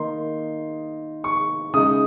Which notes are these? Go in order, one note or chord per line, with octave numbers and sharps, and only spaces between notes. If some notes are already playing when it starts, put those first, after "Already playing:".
Already playing: D#3 A#3 D#4 C6
C#6
C#3 G#3 D#4 D#6